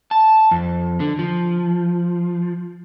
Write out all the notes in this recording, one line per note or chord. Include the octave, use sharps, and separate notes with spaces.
A5
F2
D3
F3